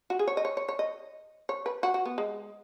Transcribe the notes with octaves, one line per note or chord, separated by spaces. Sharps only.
F#4
G#4
C#5
D#5
C#5
C#5
C#5
D#5
C#5
B4
F#4
F#4
B3
G#3